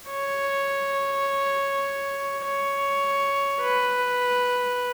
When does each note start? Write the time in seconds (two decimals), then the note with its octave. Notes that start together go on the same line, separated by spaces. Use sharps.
0.10 C#5
2.45 C#5
3.61 B4